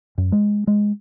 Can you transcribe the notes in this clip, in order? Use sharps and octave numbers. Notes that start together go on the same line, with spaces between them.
F#2
G#3
G#3